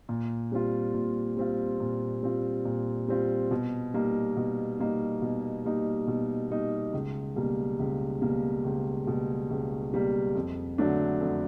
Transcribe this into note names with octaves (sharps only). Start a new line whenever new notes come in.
A#2
G3 C4 F4
A#2
G3 C4 F4
A#2
G3 C4 F4
A#2
G3 C4 F4
B2
G3 A#3 D#4
B2
G3 A#3 D#4
B2
G3 A#3 D#4
B2
G3 A#3 D#4
C#2
B2 G3 A#3
C#2
B2 G3 A#3
C#2
B2 G3 A#3
C#2
B2 G3 A#3
F2
D3 F#3 A3 D4
F2